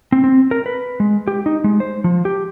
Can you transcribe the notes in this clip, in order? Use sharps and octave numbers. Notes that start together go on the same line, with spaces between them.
C4
C4
A#4
B4
G#3
G4
D#4
G#3
C5
F3
G4